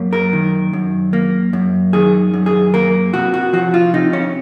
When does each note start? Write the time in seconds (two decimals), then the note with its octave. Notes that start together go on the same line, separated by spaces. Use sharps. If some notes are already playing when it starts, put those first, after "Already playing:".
Already playing: F#2 A#3
0.13 A#4
0.33 D#3
0.73 F#2
1.13 A#3
1.53 F#2
1.93 D#3 G#4
2.33 F#2
2.46 G#4
2.74 A#3 A#4
3.13 C3 F#4
3.34 F#4
3.53 F3 F#4
3.74 F4
3.94 C3 D#4
4.13 C#4